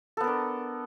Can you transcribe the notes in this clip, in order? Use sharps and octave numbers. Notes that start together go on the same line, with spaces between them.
B3 D4 A4 A#4